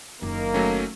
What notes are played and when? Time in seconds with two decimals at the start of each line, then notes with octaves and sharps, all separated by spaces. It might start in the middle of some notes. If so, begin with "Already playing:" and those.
0.22 F#1 D#3 A#3
0.54 F#3 A3 C#4